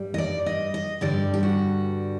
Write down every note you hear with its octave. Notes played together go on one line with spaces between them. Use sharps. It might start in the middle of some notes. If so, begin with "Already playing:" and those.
Already playing: G2 G3
D#5
D5
D#5
D#5
G2 D3 G3 D5
G4
F#4